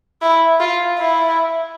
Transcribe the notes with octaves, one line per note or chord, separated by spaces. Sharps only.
E4
F4
E4